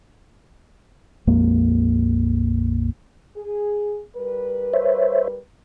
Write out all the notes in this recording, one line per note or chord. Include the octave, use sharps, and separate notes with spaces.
A#1 F2 G#3 A#3
G#4
G3 A#4 B4
C5 C#5 E5